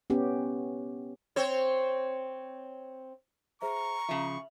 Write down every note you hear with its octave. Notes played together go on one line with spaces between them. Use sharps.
B3 C#4 G4
C4 C5 C#5
G#4 C5 E5 A#5 C#6
C#3 F3 E5 F7 F#7